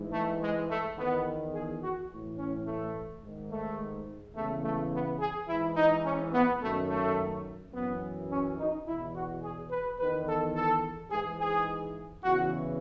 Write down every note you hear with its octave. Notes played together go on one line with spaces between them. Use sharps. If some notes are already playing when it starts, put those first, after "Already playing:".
Already playing: G#2 E3
A3
G#3
A3
E2 D#3 B3
G#4
F#4
A2 E3
C#4
A3
G#2 D#3
A3
E2 C#3 E3 A3
A3
B3
G#4
G#2 E3 E4
D#4
C#4
B3
F#2 D#3 A3
A3
F#2 E3 B3
C#4
D#4
E2 B2 E4
F#4
G#4
B4
E2 B4
D#3
A4
A4
G#2 E3 G#4
G#4
E2 C#3 E3 F#4